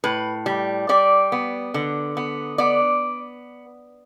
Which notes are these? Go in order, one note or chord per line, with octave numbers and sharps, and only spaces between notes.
A2 B4
G3
G3 D5
B3
D3
B3
B3 D5